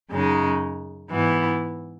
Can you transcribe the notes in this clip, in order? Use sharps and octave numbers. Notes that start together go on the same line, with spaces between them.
F#2 C#3 G#3 D#4
G#2 E3 B3 E4